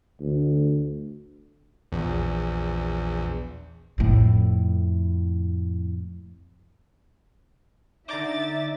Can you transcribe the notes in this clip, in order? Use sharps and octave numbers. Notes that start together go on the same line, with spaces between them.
D2
A#1 E2
F2 A2
D3 D#4 D5 E5 A#5 D6 A6